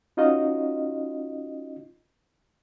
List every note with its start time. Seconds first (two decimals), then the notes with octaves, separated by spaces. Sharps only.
0.17 C#4 D#4 F4 F#4 D#5